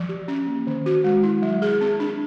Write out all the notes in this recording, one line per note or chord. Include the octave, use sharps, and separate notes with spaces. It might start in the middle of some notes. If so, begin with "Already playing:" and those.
Already playing: F3
G4
C#4
A#3
D#3
F#4
G#3
E4
F#3
G#4
C4
D4